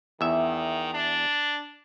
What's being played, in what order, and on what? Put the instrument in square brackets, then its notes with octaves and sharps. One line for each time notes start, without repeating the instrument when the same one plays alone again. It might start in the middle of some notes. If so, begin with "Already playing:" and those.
[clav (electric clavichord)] E2 E5 [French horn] D#3
[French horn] D4